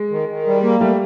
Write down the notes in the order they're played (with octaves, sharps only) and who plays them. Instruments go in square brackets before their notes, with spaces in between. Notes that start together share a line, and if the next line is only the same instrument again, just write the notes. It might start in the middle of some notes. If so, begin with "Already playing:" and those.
Already playing: [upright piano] G#3
[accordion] D#3
D#3
G3
A#3
[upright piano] G3 [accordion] A3